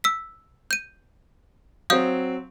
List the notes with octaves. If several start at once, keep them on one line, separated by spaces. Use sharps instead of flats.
E6 B6
G6 D#7
F#3 C4 F5 D#6 G6